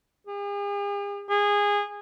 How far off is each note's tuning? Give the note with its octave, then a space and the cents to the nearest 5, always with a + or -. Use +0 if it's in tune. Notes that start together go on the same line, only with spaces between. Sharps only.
G#4 -45
G#4 -20